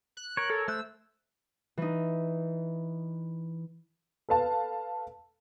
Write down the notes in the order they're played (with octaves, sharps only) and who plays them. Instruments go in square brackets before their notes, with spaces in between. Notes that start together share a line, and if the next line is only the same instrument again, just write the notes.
[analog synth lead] F#6
[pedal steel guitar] A#4 C#5
[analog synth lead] A4
[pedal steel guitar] A3 C5 F#6 [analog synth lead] E6
[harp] E3 D#4
[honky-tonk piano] A4 B4 F5 A5